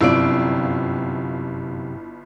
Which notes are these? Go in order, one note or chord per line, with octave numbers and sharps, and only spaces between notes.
G1 F#2 C3 E4 F4 D5 E6 D7